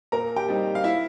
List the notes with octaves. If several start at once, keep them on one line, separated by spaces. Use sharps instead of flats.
A#2 A#4 A#5
G4 G5
G3 C4 D#4
F5
E4 E5